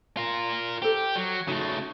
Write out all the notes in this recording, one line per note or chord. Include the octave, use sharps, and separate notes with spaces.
F4 A#4
G4 A4 C5
F#3
C#3 A3 D#4 F#4